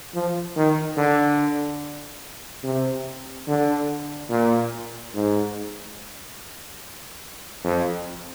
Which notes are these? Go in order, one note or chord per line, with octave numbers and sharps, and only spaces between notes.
F3
D#3
D3
C3
D3
A#2
G#2
F2